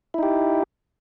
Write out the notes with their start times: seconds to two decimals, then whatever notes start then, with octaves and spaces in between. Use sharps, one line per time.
0.14 E4
0.18 D#4
0.23 G4